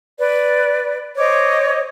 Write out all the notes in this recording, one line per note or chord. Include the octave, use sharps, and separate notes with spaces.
B4 D5
C5 C#5 D#5 D6